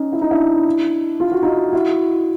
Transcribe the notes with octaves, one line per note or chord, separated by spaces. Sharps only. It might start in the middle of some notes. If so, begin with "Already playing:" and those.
Already playing: C#4 D#4
E4
D#4
D4 E4
F4
F#4
D#4 F4
E4 F#4